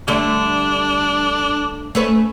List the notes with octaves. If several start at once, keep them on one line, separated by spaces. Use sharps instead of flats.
D3 G3 A3 D4
A3 C#4 B4